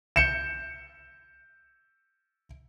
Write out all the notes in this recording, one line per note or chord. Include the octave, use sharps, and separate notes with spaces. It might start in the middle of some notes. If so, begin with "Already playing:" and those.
G6 C#7 E7